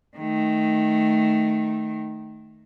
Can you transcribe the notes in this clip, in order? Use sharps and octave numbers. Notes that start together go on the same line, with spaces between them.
D#3 A3